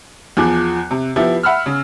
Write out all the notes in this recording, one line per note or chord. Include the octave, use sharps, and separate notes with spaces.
E2 F3 G#4 D6 F#6
C3
F3 B3 E4 G4
E5 F#5 B5 E6 F6
C#3